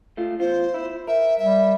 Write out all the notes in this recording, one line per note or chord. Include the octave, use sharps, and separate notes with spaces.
A3 F4
E2 F4 C5
E4
A#4 E5
G3 E5